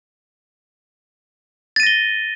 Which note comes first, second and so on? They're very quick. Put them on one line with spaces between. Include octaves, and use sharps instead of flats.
A6 D#7 A#6 G7